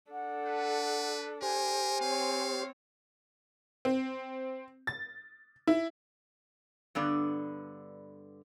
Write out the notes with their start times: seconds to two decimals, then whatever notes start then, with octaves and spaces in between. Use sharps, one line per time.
0.12 D4 A4 F#5
0.46 B4
1.42 G4 A#4 C5 G#5
2.01 C4 C#5 F5
3.85 C4
4.87 A6
5.67 E4
6.95 G2 D3 B3 D5